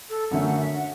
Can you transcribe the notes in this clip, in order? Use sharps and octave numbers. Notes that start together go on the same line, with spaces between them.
A4
F#2 D3 A3 C#4 F#5
F#5
E5
F#5